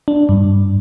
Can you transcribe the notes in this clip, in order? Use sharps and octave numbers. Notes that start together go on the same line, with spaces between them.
D4
G2